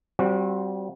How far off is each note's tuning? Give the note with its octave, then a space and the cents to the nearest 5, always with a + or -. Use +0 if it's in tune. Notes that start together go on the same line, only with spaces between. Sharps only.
G3 -25 C4 +0 F#4 -30